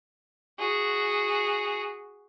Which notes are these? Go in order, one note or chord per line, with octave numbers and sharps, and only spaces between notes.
F#4 G#4